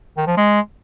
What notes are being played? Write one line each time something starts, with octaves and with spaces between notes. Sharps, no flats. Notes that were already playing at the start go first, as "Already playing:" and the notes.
D#3
F3
G#3